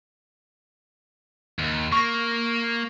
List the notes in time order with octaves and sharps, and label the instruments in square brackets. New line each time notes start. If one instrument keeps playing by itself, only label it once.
[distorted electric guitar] D#2
[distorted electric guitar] A#3 [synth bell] C#6 A#6